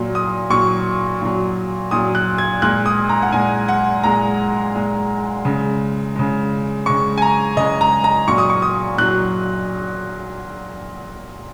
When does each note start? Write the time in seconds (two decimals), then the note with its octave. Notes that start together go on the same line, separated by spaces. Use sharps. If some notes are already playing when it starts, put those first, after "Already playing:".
Already playing: A#2 F#3
0.15 D#6
0.50 A#2 F#3 C#6
1.21 A#2 F#3
1.91 A#2 F#3 D#6
2.15 F#6
2.38 G#6
2.62 A#2 G#3 F#6
2.86 D#6
3.09 A#5
3.22 F#5
3.32 A#2 G#3 G#5
3.68 F#5
4.03 A#2 G#3 A#5
4.75 A#2 G#3
5.45 C#3 G#3
6.16 C#3 G#3
6.86 C#3 G#3 C#6
7.18 G#5
7.22 A#5
7.57 C#3 G#3 D#5
7.81 A#5
8.04 A#5
8.28 A#2 F#3 C#6
8.38 D#6
8.50 C#6
8.62 D#6
8.98 A#2 F#3 F#6